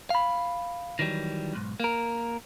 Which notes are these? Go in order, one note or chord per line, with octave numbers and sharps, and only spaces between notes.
F5 B5
D#3 E3 F#3 G3
B1 G#2
A#3 A#4